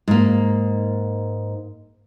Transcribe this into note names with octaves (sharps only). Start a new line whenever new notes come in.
G#2 A#3